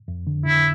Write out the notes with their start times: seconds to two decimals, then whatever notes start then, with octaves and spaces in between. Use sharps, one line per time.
0.08 F2
0.27 D3
0.46 D3 E4